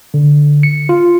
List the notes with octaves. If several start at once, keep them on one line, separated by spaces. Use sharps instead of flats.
D3
C#7
F4